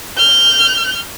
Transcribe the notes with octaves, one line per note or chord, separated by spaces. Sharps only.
F6 G6